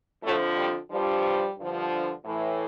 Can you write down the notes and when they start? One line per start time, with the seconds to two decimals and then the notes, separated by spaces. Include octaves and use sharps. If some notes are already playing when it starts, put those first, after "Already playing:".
0.23 F2 A2 D3 F3 A3
0.57 G3
0.91 G2 F3 G3
1.58 G2 D3 F3
2.25 A2 E3